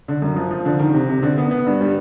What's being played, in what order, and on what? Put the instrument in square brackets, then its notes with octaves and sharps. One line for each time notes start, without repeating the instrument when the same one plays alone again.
[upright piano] D3
F#2
F3
F3
D3
D#3
C3
C3
D3
B3
B3
G2
G3